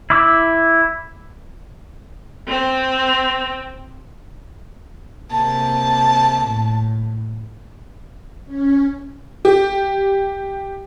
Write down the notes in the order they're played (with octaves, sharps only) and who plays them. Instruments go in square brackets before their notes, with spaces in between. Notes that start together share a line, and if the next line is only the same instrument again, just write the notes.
[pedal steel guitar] E4 D6 E6
[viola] C4
[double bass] C3 A#3 [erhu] A5
[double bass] A2
[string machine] C#4
[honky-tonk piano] G4